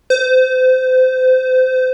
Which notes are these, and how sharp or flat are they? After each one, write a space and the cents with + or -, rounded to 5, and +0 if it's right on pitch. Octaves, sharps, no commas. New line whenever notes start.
C5 -30